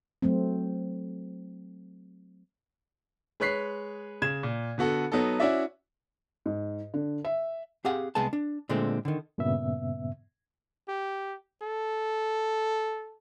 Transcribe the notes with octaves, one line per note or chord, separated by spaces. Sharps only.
F#3 A3 C4
G#3 B4 C#5 F#6 B6 C7
C#3 G#6 E7
A#2
D3 B3 F#4 A4
F#3 B3 D#4 A4
C#4 E4 F#4 D5 E5
G#2
D3
E5
C4 G4 G#4 F5 F#5
C2 G#3 B3 G#4 A5
D4
A#2 D3 G#3 A3 C4
D3 D#3
G2 A#2 C#3 B3 E5
G4
A4